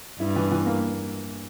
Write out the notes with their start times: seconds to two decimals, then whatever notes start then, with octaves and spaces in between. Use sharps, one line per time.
0.19 G2 E4
0.36 E3
0.51 E3
0.66 A#3